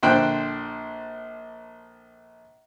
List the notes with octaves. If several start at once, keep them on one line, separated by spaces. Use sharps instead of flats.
A#1 D3 C5 G5 F#6